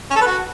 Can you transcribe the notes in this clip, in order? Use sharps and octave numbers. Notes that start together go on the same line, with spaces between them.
C#4
A4
B4
F#4